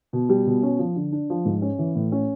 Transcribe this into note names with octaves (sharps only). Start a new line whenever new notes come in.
B2
G3
B2
C#4
F3
D3
D4
F3
G#2
C#4
E3
A2
C#4